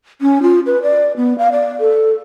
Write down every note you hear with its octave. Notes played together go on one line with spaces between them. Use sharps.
C#4
F4
B4
D5
B3
F5
D5
A4